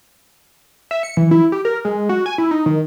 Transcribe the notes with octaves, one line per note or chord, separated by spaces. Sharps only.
E5
C#7
E3
E4
G4
A#4
G#3
F#4
G#5
E4
D#4
D#3